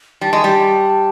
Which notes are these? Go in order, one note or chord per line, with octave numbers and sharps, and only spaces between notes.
G3 A5
G#3
G3